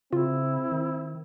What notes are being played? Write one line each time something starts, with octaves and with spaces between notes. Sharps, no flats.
C#3 C4 E4 F4
D#3